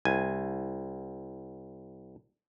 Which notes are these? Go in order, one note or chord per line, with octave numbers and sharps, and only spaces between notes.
C2 G#5